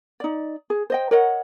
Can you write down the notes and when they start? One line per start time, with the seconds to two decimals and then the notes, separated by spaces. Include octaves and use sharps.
0.20 D#4 D5
0.70 G#4
0.90 C5 D#5 G5
1.11 A#4 C#5 D#5 F#5